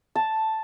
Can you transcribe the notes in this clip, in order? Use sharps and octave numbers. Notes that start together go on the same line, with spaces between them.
A5